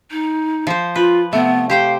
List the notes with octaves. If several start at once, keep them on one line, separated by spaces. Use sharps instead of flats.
D#4
F3 C5
F4 B4
C3 A3 B3
G4 C5 F5 G5